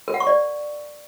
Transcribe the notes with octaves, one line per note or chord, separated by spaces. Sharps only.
A#4
F#5
C#6
D5